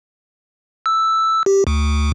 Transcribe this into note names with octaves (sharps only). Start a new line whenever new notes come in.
E6
G4
D2